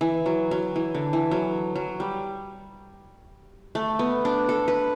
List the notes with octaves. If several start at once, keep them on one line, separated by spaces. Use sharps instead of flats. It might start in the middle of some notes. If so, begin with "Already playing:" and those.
E3
F#3
F#3
E3
D3
E3
F#3
F#3
G3
A3
B3
D4
A4
B4